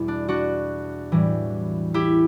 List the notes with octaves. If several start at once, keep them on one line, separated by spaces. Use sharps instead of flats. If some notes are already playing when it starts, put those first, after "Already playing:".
Already playing: E2 B2 G3 E4
D4
D4 F#4
A2 E3 G3
E4 G4